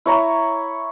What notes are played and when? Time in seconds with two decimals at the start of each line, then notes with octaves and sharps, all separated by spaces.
0.06 E4 C#5 A#5